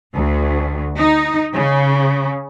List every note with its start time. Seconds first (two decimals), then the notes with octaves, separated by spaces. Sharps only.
0.15 D2
0.96 D#4
1.55 C#3